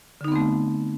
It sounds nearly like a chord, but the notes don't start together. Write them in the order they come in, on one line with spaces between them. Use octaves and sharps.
D3 D#4 B3 C4 A3